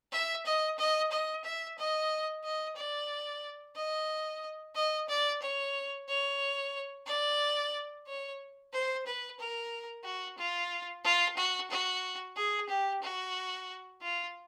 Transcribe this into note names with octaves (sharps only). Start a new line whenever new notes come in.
E5
D#5
D#5
D#5
E5
D#5
D#5
D5
D#5
D#5
D5
C#5
C#5
D5
C#5
C5
B4
A#4
F#4
F4
F4
F#4
F#4
G#4
G4
F#4
F4